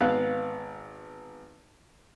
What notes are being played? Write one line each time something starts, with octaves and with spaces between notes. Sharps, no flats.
G#1 B3 F5 F#6